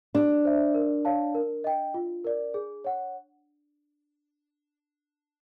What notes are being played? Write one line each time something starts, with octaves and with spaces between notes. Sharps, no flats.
D4 G4
C5 E5
A#4
C#5 F5 A5
A#4
D#5 G5
F4
A#4 D5
G#4
C#5 F#5